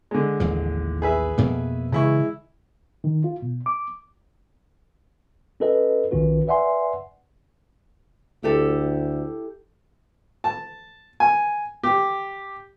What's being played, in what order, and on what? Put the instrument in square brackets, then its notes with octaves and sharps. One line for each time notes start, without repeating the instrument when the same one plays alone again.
[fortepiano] D3 G#3
[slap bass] A1 D#2 F3
[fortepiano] G#4 B4 E5
[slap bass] F2 B2 A#3
[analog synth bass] C#3 [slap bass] E3 [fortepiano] G#3 E4 C#6
[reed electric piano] D#3
F4
B2
D6
[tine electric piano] C#4 F#4 A4 B4 D#5
B1 D#3 C#4 F4 F#4 B4
B4 D5 E5 F#5 G#5 C6
[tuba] D2 [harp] E4 G4 A4
[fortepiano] A5
G#5
G4